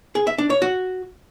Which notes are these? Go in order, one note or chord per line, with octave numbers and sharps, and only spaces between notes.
G#4
E5
D4
C#5
F#4